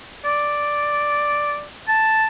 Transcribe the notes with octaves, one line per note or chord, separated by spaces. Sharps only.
D5
A5